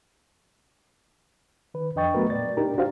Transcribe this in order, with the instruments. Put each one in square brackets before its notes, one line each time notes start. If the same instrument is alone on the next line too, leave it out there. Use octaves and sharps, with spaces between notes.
[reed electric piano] D#3 B4
F2 D4 D#5 G5 C#6 A6
F#3 A3 B3 F#4 A#4 B4
A#2 D5 A6
D4 D#4 G4 A#4
D4 F#4 G4 C5 F5